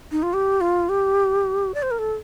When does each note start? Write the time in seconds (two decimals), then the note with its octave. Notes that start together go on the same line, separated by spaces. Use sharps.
0.12 D#4
0.23 F4
0.33 G4
0.61 F4
0.89 G4
1.74 D5
1.83 C5
1.91 A#4
1.99 A4